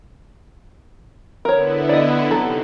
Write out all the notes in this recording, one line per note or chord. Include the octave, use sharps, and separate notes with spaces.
D3 B3 E4 A#4 C#5
D5 D#5
C3 F#3 C4 D#4 A4